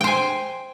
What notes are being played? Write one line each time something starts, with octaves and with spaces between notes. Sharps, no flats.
C5 G5 G#5